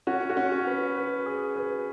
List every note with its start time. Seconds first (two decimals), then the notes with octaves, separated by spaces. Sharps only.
0.07 C#4 F#4
0.30 F#4
0.37 C#4
0.52 F#4
0.67 B4
0.96 B4
1.26 G#4
1.56 B4